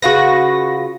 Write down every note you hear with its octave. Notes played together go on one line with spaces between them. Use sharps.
C#3 F4 F#4 B4 A#6